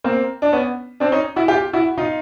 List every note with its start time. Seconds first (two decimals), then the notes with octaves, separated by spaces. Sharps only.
0.04 A#3 C4
0.42 D4
0.52 B3 C#4
1.00 C4 D4
1.12 C#4 D#4
1.36 E4 F#4
1.48 F4 G4
1.73 E4 F#4
1.98 D#4 F4